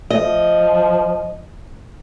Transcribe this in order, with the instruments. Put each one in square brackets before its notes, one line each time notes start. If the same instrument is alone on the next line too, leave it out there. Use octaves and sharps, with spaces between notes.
[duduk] F3 [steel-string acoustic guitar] D#5